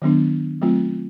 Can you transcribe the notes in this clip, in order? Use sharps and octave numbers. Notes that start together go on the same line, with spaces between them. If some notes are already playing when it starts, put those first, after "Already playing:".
D#3 F#3 B3 D4
F#3 A3 C4 F4